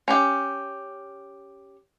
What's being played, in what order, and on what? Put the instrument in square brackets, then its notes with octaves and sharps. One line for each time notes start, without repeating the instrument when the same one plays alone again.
[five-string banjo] C#4 G4